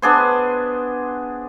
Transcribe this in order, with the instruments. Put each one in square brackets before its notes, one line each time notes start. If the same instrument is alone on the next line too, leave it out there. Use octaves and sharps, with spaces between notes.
[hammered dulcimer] B3 D4 G#4 C5